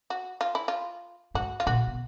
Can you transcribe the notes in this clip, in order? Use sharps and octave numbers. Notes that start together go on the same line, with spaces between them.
F#4
F4
E4
F4
G#2 F#4
F4
A#2 F#4
B2